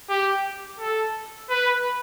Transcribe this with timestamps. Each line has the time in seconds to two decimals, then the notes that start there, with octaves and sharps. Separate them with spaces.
0.10 G4
0.80 A4
1.50 B4